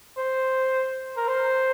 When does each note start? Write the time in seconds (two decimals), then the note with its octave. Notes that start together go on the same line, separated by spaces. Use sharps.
0.17 C5
1.17 A#4
1.28 C5